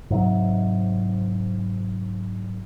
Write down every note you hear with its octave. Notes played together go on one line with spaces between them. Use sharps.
G#2 C3 F#3